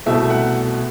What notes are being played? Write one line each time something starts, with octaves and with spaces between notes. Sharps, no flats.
C2 B2 A3 E4 E5
F#5